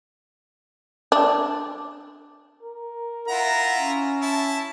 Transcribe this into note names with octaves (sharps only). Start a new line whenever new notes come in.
D4
A#4
E4 F4 F#5 A#5
C#4
E4 A5